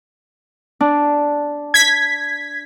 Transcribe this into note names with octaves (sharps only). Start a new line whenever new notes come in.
D4
G#6 B6